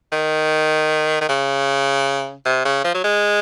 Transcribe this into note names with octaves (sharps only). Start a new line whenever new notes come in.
D#3
D#3
C#3
C3
C#3
F3
F#3
G#3